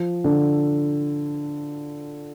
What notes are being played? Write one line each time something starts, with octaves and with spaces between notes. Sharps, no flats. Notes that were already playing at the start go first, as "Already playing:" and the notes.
Already playing: F3
D3